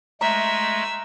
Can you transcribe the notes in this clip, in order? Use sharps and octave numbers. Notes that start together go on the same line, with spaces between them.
G#3 A3 E5 A#5